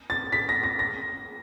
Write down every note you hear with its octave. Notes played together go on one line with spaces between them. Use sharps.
A6
B6
A#6
A#6
A#6